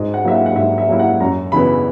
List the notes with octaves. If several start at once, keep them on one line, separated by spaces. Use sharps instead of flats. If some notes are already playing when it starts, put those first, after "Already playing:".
Already playing: G#2 D#5
F#5
F#3 A#3 E4 E5
F#5
F#5
G#2 E5
E5
F#3 A#3 E4
F#5
F#2 A#5
C#3 E3 B3 E4 B5